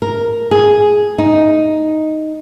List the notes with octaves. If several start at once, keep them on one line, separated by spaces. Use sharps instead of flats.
A#4
G#4
D#4